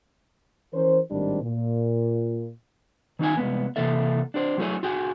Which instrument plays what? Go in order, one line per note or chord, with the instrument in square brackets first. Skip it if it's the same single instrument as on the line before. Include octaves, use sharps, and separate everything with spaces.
[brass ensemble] E3 C#4 A#4 C5
G#1 A2 D#3 G3 C4 D4
A#2
[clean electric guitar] D#3 C#4 D#4 G#5
C2 A#2 G#3 B3
C3 E3 A#3 A4 E5
D4 G4 C5
F#3 A3 E4 G4 G#4 C#5
F4 F#4 G#4 G5